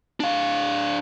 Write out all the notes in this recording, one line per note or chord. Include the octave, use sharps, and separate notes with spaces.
D4 F5